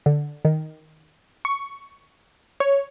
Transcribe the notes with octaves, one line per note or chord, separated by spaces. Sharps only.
D3
D#3
C#6
C#5